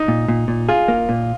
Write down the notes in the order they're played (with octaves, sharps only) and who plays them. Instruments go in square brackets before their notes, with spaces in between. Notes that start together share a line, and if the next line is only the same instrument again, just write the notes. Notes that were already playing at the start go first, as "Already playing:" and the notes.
Already playing: [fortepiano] D#4
[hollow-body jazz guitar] A#2
A#2
A#2
[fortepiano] F4 [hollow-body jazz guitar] G#4
[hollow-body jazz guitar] A#3
A#2